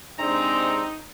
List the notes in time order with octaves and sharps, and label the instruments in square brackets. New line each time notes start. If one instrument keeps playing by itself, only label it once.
[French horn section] C3 G#3 D4 [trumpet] C4 [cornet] D#4 [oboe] A#5